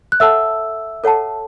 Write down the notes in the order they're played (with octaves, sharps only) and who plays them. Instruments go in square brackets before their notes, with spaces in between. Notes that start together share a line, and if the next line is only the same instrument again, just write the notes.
[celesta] F#6
[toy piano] A4 C#5 F#5 A5 [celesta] E5 E6
[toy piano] A4 C#5 F#5 A5